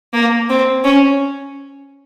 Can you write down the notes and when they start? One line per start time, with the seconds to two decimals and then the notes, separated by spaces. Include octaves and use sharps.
0.13 A#3
0.49 C4
0.84 C#4